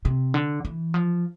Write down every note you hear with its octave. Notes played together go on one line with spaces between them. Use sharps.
C3
D3
E3
F3